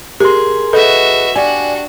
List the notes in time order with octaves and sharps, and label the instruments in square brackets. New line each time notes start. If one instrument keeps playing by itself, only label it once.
[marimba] G4 [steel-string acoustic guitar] G#4 [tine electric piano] A#4 C6
[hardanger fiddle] F#4 E5 [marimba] A4 [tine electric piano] B4 D#5
[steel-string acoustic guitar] D4 G4 [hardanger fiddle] F#4 [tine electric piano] D5 G#5